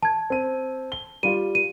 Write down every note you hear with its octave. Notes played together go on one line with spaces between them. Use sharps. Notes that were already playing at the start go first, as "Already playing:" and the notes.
A5 G#6
C4 D#7
G7
G3 F4 D#7
D#7